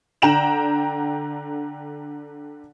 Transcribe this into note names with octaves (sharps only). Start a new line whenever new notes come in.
D3 G5 A#5 E7 F#7